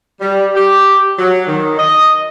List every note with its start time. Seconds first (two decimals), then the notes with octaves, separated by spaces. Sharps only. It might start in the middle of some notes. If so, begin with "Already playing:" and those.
0.21 G3
0.54 G4
1.18 F#3
1.47 D#3
1.78 D#5